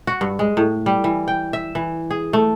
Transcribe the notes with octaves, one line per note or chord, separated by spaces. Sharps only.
F#4
G2
G#3
A2
G3
E3
G5
E5
E3
G#4
A3